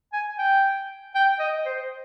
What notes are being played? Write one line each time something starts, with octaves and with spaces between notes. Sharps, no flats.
G#5
G5
G5
D#5
C5